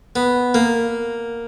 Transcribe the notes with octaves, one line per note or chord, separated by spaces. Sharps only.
B3
A#3